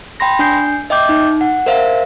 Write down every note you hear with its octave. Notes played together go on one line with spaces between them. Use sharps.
G5 B5 C6 A#6
D4 G#5 G6 C7
D#5 E5 G5 D6 G6
D#4
F#5
A#4 C5 E5 F5